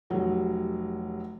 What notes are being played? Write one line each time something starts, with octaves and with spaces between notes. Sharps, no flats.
F1 F#3 G3